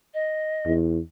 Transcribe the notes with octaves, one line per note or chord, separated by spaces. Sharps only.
D#5
E2